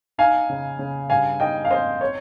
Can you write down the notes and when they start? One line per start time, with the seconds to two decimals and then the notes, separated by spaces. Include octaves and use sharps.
0.18 D#4 F5 G#5
0.49 C#3
0.79 C#3
1.10 G2 F5 G#5
1.40 D#4 D#5 G5
1.65 F5
1.70 C4 C5 D#5
2.01 C4 C#5